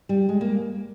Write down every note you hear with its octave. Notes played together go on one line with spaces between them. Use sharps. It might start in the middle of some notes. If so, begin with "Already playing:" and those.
G3
G#3
A#3